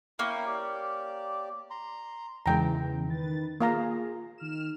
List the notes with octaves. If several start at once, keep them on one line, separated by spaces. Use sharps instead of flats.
A#3 C#4 E4 G5
G4 D5
A#5 C6
E2 C#3 E3 G#3 G5 A#5
D#3 B4 A6
A#3 F4 G#4 F5 A#5
D#3 F6 E7